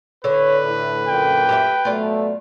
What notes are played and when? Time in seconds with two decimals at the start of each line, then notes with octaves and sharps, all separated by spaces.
0.24 A2 D3 A4 B4 C#5
0.64 A2
1.08 F#2 A#2 G5
1.49 G4 A4 E5
1.85 B2 F#3 A3 F4 D5